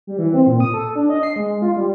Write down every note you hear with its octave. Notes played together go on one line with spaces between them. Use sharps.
G3
E3
C4
A#2
D#6
A4
D4
D#5
C7
G#3
F4
G3